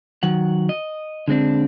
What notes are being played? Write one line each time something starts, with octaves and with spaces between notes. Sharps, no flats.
D#3 F#3 F#5
D#5
D3 G#3 C4 D4